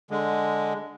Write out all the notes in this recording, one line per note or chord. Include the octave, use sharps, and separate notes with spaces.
D3 G#3